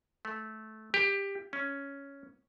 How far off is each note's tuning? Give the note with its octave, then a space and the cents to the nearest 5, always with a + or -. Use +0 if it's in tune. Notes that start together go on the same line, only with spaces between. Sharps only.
A3 -15
G4 +15
C#4 +5